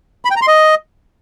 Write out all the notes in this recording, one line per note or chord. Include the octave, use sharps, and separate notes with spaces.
B5
G5
A#5
C6
D#5